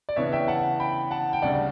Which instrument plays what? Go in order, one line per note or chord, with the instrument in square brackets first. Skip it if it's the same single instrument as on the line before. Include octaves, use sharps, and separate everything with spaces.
[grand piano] D5
[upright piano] C#3 E3 B3 D4 [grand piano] C#5 E5
[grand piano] E5 G5
F#5 A5
G5 B5
F#5 A5
G5
[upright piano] D2 C#3 G3 [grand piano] D5 F#5